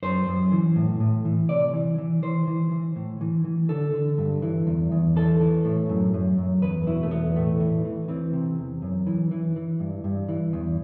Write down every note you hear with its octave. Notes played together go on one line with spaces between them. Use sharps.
F#2 C5
F#2
E3
A2
A2
E3
C3 D5
E3
E3
E3 C5
E3
E3
A2
E3
E3
D3 A4
D3
G2
E3
E2
E2
E3 A4
E3
A2
F#2
F#2
F#2
E2 B4
B2 E4
A3
E2 B3
A2 A3
E3
E3
E3 C4
C3
E2
F#2
E3
E3
E3
G2
G2
E3
E2